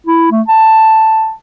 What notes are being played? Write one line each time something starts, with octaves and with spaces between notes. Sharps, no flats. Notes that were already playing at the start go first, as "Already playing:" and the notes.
E4
A3
A5